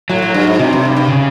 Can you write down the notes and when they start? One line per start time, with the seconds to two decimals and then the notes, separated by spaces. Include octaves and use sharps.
0.10 A2 F#3
0.22 A2
0.34 G2
0.47 G#2
0.59 G2 C3
0.73 F#2
0.85 G2
0.97 G2
1.10 C#3